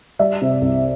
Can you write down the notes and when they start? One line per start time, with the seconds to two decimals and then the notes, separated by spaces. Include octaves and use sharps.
0.19 G3 D5 E5
0.41 C3
0.61 C2